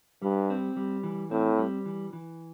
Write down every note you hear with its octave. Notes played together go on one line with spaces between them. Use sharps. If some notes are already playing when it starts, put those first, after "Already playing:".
G2 G3
C4
G3
E3
A2 C4
G3
E3
E3